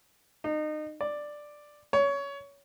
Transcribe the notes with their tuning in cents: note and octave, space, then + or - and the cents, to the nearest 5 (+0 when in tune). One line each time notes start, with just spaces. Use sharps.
D#4 -30
D5 +5
C#5 +20